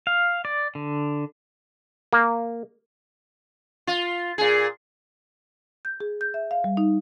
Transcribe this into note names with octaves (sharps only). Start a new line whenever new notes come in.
F5
D5
D3
A#3
F4
A#2 G#4
G6
G#4
G6
E5
F5
G3
D#4